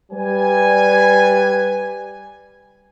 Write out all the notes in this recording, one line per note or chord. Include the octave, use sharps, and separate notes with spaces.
G3 B4 G#5